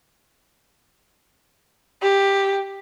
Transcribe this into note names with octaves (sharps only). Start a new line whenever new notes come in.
G4